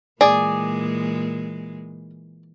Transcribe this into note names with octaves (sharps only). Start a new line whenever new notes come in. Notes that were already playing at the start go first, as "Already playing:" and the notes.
A#2 E3 G#3 G#4 D5